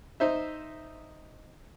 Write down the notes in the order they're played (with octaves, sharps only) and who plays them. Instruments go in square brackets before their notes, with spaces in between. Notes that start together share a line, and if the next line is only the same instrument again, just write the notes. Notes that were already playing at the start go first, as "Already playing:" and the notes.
[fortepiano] D#4 C5 E5